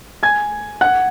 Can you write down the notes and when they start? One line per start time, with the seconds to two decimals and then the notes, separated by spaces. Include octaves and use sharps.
0.23 G#5 G#6
0.81 F#5 F#6